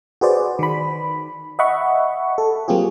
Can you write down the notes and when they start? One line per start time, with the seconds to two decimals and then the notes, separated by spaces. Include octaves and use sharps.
0.21 F#4 G#4 B4 C5 D5
0.59 D#3 B5
1.59 D#5 E5 F#5 B5 C#6
2.38 A4
2.68 F#3 A#3 C4 F4 G4 G#4